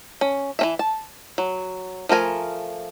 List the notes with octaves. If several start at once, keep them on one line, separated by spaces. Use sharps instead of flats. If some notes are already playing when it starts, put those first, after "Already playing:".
C#4
E3 C#4 E5
A5
F#3
F3 A3 A#4 G#5